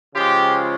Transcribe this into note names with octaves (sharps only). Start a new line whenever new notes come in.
C#3 F3 G#3 F4 G4